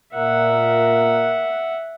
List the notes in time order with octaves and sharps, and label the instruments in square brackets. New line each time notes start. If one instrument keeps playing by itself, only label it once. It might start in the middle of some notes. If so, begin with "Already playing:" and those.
[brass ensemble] A#2 A#4 [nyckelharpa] E5 F#5